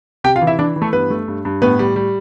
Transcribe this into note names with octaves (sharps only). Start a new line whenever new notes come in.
C3 G4 G5
F4 F5
E3
E4 E5
E3 D4 D5
E3
A3 A4
G2 B3 B4
A3
G2
G2
A2 B3 B4
G3
G3